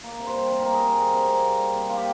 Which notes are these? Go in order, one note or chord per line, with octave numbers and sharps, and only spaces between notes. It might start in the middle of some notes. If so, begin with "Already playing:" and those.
A#3
C3
C5
G3
C3 A#4
A#3 A#4
G#4
C3
G3
C3
A#3
C3
G3
C3
A#3 F4
G4